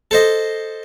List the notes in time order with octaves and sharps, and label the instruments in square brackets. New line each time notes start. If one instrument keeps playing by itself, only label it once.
[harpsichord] A4 C5 D#5